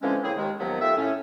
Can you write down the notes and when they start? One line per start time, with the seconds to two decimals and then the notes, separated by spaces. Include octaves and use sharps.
0.02 D3 E3 F3 G#3 C4 C#4
0.23 C#3 A#3 C4 E4 G#4
0.37 D#2 D#3 G#3
0.59 D#2 D#3 F3 F#3 B3
0.81 A3 F4 G4 E5
0.97 A2 C#4